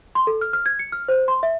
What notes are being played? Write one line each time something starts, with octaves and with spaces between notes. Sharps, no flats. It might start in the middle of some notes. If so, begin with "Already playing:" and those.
C6
A4
F6
F6
G#6
C#7
F6
C5
C6
E5